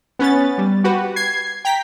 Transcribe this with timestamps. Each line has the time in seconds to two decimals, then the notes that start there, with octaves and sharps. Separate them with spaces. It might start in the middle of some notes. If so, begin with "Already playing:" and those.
0.19 B3 C#4 B4 A6
0.58 G3
0.84 F#4 G4 B4
1.16 G#6 C7
1.65 G5 A#5 B6